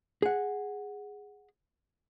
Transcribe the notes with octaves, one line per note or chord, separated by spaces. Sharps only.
G#4 F#5